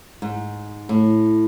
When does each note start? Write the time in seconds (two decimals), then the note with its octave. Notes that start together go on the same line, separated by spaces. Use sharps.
0.22 G#2
0.89 A2